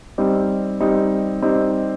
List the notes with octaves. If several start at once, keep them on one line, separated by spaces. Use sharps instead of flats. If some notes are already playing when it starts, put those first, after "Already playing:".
G3 C4 D#4 G4
G3 C4 D#4 G4
G3 C4 D#4 G4